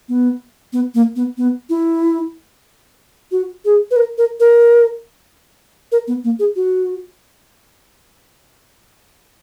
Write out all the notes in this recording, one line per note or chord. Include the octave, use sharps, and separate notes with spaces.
B3
B3
A#3
B3
B3
E4
F#4
G#4
B4
A#4
A#4
A#4
A#4
B3
A#3
G#4
F#4